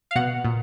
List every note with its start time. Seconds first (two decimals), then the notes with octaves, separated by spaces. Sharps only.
0.11 F5
0.15 B2 F#5
0.44 A#2